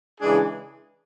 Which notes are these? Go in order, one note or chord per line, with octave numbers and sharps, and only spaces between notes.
C#3 E3 G#3 D4 G#4